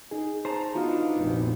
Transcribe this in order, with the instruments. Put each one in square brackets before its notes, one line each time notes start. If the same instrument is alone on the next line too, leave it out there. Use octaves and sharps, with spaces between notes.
[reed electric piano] D#4 G#4
[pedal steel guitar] C5 A5 A#5
[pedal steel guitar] B3 D4 D#4 [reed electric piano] F4 F#4 F5
[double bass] F1 A#1